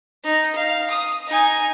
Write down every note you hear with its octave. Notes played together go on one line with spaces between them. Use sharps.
D#4
F5
D#6
D#4 G#5